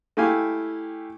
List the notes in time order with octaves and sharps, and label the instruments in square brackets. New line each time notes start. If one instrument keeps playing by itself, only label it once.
[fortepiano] A3 E4 G4 F5 G#5